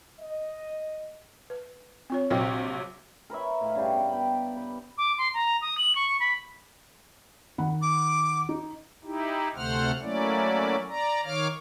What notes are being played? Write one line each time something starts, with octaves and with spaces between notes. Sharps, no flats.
D#5
B4
C4 F4 C#5
A#1 C3 F#3 C5 D#5 G5
A#4 B4 C#5 E5
A2 D#5 F5
G2 C#3 D4 G4
B3
G5 B5
B4
D6
C6
A#5
D#6
F#7
C#6
B5
D#3 F#5 B5
D6
D#4
D#4 E4 G4
D2 C3 A3 C5 F#5 F6
F#3 A3 A#3 C#4 E4 D5
D5 A#5
D#3 C#5 F5 D6 F6